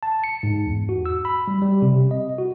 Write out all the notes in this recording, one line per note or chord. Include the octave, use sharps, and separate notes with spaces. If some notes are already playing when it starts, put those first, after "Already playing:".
A5
C#7
G#2
E2
F#4
E6
B5
G3
G3
C3
D#5
F#4